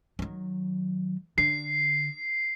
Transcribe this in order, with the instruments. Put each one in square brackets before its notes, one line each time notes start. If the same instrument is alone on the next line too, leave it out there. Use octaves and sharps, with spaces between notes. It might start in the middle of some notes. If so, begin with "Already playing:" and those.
[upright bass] D#3 F#3
[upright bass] D3 [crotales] C7